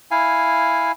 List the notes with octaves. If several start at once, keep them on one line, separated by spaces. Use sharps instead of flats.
E4 F5 G#5